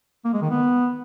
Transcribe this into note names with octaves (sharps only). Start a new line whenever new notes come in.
A#3
G#3
D#3
B3